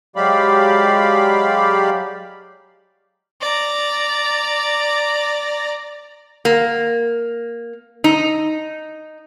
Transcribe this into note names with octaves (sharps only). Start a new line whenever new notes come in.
F#3 G#3 G4 D5 F5 B5
D5 A#5
A#3
D#4